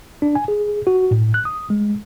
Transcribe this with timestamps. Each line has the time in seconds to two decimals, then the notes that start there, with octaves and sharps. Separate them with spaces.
0.22 D4
0.35 G#5
0.48 G#4
0.87 F#4
1.11 A2
1.34 F#6
1.45 D#6
1.70 G#3